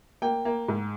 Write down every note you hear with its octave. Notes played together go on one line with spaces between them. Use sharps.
A#3 G5
A#3
G#2